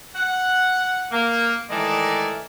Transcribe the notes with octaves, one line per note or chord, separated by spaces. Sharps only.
F#5
A#3
D#3 E3 G#3 A3 A#4 D5